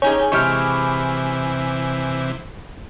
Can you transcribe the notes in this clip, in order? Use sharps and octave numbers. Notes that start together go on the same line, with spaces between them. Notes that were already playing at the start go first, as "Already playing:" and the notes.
C#4 D#4 G4 G#4 C#5 G#5
C3 E3 G#3 E4 G4 C#6 F6